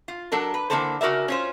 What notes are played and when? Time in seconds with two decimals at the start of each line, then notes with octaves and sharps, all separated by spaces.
0.08 F4
0.32 F#3 D4 A4 A#4
0.54 B4
0.70 D3 E3 A#3 B3 A4 C5
1.01 C#3 F#4 A#4 D5 E5
1.28 C#4 F4 C5